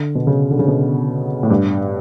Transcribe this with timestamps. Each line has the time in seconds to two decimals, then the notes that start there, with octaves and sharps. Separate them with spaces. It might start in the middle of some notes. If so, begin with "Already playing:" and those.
Already playing: D3
0.15 B2
0.27 C#3
0.51 D3
0.59 C#3
0.68 B2
1.43 A2
1.50 G2